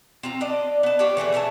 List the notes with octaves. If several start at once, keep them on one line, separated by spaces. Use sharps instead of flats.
C4 F4 A#5
D4 D5 D#5
B3 A5
F4 G4 C#5 D5
E3 A3 G#4 B4
C#4 E4 G#4 A5